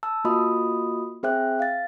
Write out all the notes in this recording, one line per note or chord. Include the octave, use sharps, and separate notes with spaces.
A5 E6
A#3 F4 F#4 D#5 B5 D#6
C4 G#4 C5 E5 G5 F#6
F5 A6